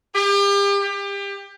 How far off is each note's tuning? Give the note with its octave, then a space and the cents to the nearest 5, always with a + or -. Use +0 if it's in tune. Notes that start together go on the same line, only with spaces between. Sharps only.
G4 +35
G4 +30